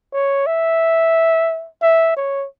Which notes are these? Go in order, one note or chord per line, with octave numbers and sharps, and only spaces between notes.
C#5
E5
E5
C#5